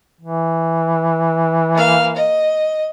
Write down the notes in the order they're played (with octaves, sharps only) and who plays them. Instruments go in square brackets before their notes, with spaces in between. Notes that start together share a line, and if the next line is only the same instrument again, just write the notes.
[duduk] E3
[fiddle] A#3 F5
D#5